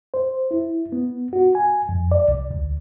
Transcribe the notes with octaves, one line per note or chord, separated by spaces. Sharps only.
C5
E4
B3
F#4
G#5
F2
D5
C2
D2